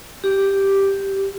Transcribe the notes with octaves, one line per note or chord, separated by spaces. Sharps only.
G4